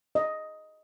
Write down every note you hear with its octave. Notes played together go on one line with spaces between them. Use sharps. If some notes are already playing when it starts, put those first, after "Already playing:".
D#5